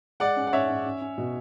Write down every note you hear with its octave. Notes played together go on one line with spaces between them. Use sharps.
G#3 D5 F#5
C#4
F#5
C#4 C#5 E5
C#4
C#4
C#4
B2